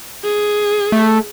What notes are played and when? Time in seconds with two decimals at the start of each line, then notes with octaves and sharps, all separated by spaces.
0.24 G#4
0.92 A3